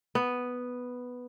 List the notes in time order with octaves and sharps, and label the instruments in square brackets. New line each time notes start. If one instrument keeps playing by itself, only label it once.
[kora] B3